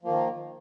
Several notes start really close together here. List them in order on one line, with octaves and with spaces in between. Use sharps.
F3 A#3 D#3